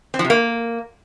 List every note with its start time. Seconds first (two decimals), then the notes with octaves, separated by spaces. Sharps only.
0.14 C4
0.19 F3
0.25 C3
0.30 A#3